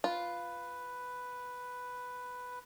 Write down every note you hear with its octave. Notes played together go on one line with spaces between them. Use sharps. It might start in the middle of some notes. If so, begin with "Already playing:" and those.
F4 B4